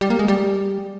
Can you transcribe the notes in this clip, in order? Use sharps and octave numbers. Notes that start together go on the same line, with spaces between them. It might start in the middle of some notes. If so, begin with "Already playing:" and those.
G3
A#3
G#3
G3